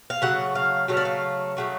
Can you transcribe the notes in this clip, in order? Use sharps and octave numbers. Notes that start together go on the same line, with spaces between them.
F5
C#3 F#3 A3 F#5
F5
C#3 F#3 A3 F5
D5
F5
C#3 F#3 A3